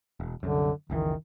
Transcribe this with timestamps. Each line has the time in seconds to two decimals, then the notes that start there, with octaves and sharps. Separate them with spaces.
0.20 E1
0.43 C2 F#2 D3
0.90 F#1 C#2 D#3 E3